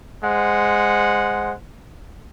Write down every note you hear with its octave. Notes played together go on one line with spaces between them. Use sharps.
G#3 C5 F#5